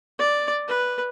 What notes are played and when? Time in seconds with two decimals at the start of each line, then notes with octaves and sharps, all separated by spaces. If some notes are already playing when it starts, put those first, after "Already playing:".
0.19 D5
0.68 B4